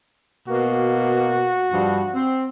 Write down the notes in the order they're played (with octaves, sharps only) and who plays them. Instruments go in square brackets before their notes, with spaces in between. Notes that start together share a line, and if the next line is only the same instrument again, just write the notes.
[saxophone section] B2 A#3 [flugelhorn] F#4
[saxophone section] G2 F3 G3
C4